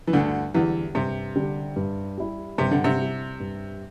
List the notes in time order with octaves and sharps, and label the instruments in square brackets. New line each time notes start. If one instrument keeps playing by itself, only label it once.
[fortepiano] E3
[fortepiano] D2 D3 [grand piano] G2
[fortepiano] E2 E3 [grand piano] D3 G3 D4 G4
[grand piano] G2 [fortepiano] C3
[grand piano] D3 G3 D4 G4
G2
G3 E4 G4
[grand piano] G2 [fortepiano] C3
[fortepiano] D3
C3
[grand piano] G3 E4 G4
G2